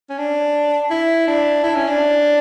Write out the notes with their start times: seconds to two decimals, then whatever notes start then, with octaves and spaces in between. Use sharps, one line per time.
0.10 C#4
0.18 D4
0.90 E4
1.27 D4
1.64 E4
1.75 C#4
1.88 D4